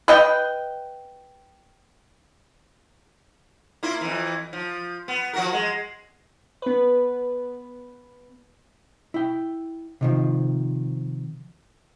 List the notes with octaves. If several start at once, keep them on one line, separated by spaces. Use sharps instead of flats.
B4 D#5 G5
A#3 E4 F4
F2 E3
F3
B3
F3 F#4 A#4
G#3
B3 B4
E4 G5
C3 D#3 F3